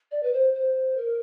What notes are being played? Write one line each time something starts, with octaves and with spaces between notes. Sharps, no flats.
D5
B4
C5
C5
A#4